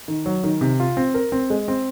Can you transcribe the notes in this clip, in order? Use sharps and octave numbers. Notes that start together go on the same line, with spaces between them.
D#3
F#3
D#3
C3
F4
C4
A#4
C4
G#3
C4